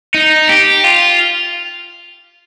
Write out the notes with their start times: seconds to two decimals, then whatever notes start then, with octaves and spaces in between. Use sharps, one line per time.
0.14 D#4
0.49 G4
0.84 F4